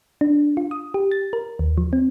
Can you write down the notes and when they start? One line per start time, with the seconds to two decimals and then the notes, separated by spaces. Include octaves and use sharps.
0.21 D4
0.57 F4
0.71 D#6
0.94 G4
1.11 A6
1.33 A#4
1.59 D#2
1.78 F3
1.93 C4